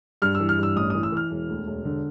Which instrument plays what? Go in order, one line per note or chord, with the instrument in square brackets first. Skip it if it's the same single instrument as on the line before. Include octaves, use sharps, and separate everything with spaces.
[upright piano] G2 F6
E6
E3
F6
G2 E6
A1 D#6
D#6
E3
E6
E3 F6
E1
D2
E1
D3